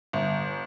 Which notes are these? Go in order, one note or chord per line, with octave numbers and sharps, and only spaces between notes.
G1